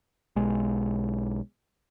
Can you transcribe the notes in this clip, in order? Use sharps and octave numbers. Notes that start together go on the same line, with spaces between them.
B1 G#3